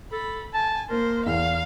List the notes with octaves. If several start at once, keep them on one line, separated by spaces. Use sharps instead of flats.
A4 B5
G#5 A5
A#3 A#4 C5
E2 F5